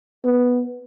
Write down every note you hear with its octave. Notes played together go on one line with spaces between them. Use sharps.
B3